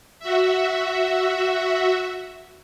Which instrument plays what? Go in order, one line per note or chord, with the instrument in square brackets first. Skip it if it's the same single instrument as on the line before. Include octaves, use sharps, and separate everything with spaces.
[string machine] F#4 E5